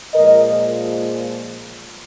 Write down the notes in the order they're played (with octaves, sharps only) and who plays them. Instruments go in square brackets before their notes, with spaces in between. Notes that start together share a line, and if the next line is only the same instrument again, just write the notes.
[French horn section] A#2 F3 G#3 A#4 D#5